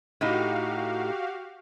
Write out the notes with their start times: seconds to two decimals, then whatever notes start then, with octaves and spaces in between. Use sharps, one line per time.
0.21 A2 D#4 F#4 G4 F5